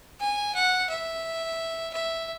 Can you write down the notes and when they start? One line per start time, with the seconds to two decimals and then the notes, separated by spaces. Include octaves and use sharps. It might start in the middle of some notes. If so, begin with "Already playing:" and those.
0.20 G#5
0.55 F#5
0.89 E5
1.93 E5